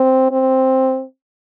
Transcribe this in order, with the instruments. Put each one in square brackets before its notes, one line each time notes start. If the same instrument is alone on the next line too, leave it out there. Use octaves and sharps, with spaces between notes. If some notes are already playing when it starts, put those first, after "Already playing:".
Already playing: [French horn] C4
C4